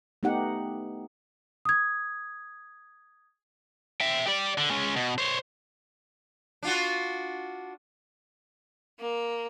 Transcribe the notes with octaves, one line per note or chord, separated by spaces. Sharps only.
A3 B3 D#4 G4 F#5
D#6 G#6
E5 G5
G4 D5
D3
G#3 C#4
B2
C5 C#5
D4 F4 F#4
A#3